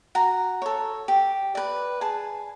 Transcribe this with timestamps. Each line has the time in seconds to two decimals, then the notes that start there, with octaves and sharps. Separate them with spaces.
0.15 F#4 A#5
0.62 A4 C#5
1.08 G4
1.55 B4 D5
2.01 G#4 A5